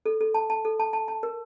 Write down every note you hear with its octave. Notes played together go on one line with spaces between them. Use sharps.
A4
A4
A5
A5
A4
A5
A5
A5
A#4